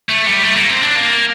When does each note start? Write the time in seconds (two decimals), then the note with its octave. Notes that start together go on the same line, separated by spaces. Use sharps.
0.09 A3
0.26 G3
0.44 A3
0.56 A#3
0.70 C4
0.83 D4
0.96 A#3